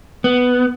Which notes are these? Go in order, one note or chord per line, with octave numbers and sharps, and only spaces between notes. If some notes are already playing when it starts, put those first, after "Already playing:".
B3